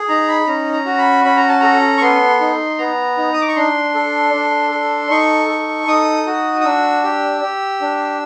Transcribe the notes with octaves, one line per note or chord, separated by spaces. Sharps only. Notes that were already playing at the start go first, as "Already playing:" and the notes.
Already playing: G#4
D#4 A#5
B5
C#4 A#5
A#5
F#4
B5
C#4 B5
A#5
A5
A4 A#5
C#6
B3 C6
D#4
B3 A#5
D#4
D#6
D6
C#6
D4 C6
A4
D4
A4
D#4 C#6
A4
D#4 D#6
F#4
D#6
D4 E6
G4
G4
D4